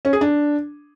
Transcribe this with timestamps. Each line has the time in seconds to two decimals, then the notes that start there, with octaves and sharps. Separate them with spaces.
0.05 C#4
0.13 G#4
0.21 D4